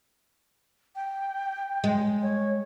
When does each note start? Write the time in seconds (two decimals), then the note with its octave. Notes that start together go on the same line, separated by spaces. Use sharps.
0.95 G5
1.84 G#3
2.22 C#5